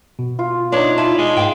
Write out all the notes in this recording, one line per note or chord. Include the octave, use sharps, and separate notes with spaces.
B2
F4
D4 D#4 C#5 C6
E4 F4 A5
G#3
G#2 F5 G5